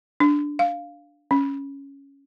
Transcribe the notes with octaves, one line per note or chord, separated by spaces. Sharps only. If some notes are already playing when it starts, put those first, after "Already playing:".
D4
F5
C#4